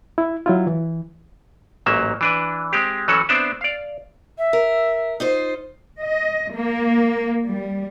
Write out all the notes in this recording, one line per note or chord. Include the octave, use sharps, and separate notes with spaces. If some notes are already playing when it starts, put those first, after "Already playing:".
E4
F#3 E4 F4
E3
A1 G#2 F#3 A#3 E5
E3 D4 B4
G#3 C4 G4
E3 F#3 C#4 F#4 A4
B3 C4 D4 C5 D5 E5
D5 F5
E5
A#4
D#4 F4 C5
D#5
A#3
G3